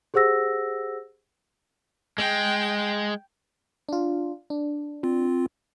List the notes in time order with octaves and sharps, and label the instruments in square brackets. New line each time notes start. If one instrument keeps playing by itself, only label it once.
[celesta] G4 G#4 C5 F#5 E6 A#6
[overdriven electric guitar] G#3 [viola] G5
[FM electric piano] D4 F4
D4
[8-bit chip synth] C4 F4